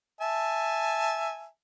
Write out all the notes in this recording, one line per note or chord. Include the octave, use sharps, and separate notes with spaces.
E5 G#5 A5